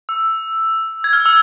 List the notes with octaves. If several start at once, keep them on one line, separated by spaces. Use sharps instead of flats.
E6
G#6
F6
E6